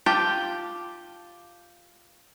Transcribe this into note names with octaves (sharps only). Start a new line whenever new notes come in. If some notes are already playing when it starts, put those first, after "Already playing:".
F4 G4 A5